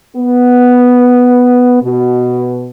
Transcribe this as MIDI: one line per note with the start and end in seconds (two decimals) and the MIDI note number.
0.16 1.79 59
1.82 2.70 47